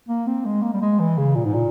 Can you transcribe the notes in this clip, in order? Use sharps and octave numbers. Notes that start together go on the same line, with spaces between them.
A#3
C4
G#3
A#3
G3
G#3
E3
C#3
A#2
G#2
A#2